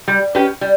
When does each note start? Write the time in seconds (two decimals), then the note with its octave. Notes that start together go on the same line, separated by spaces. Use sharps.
0.08 G3
0.35 C#4 G4 B4
0.61 G3